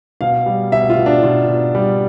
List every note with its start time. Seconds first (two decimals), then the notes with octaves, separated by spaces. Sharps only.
0.21 B2 F5
0.46 G3
0.72 B2 E5
0.90 F4
0.97 B2
1.06 D4
1.23 B2 F4
1.49 B2
1.75 G3